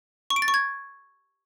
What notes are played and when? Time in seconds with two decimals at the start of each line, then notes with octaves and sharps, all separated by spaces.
0.30 C#6
0.36 D7
0.42 A6
0.48 C#6
0.54 G#6